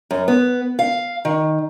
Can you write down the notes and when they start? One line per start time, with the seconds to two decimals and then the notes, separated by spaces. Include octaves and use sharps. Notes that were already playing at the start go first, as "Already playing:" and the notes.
0.11 F#2
0.28 B3
0.79 F5
1.25 D#3